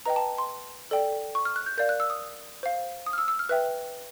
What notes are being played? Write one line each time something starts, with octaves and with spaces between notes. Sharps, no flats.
B4 D#5 G5 A#5
A5
C6
A4 D5 G5
C#6
F6
F#6
G6
A#4 D5 F5 G6
F#6
E6
D#6
C5 F5
D#6
F6
E6
E6
F6
B4 E5 G5 F#6